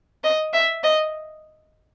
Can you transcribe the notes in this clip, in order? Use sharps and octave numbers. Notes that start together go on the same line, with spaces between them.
D#5
E5
D#5